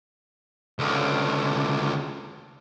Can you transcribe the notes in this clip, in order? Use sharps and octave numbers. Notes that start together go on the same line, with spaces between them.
C#2 D3